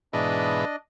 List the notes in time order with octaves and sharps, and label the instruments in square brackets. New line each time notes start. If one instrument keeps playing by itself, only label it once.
[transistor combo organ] G#2 B2 E3 [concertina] D4 D#5